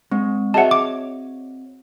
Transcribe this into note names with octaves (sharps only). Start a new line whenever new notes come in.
G#3 C4
F#4 G#4 C#5 D#5 E5 F#5 A5
D6